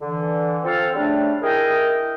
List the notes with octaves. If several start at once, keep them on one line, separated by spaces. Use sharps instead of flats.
D3 E3
F3 C4 F4 A4 F5 F6
C#3 G3 A3 D4
E4 G#4 A#4 D#5 G5